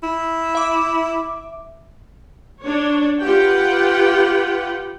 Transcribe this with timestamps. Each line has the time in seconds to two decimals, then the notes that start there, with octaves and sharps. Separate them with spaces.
0.03 E4
0.55 E5 D6
2.62 D4 C#5
3.22 F4 G4 B4 F#5 G5